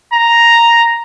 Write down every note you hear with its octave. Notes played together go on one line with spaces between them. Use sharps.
A#5